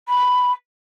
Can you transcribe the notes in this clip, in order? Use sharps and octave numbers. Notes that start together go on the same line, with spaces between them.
B5